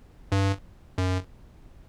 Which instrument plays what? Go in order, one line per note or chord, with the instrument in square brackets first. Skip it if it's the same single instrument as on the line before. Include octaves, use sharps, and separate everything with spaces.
[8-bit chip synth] G2
F#2